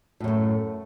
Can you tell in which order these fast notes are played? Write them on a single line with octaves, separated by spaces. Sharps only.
A2 F#2 A3